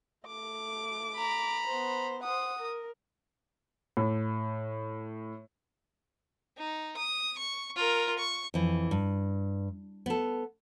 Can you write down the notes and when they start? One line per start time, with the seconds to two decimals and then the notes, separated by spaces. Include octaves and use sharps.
0.27 A3 D6
1.15 A#5 B5
1.67 B3 C5
2.24 C5 F#5 D#6
2.59 A#4
3.97 A2
6.58 D#4
6.97 D#6
7.38 C#6
7.76 F4 A#4
8.18 C#6
8.54 F2 E3
8.91 G2
10.06 B3 A4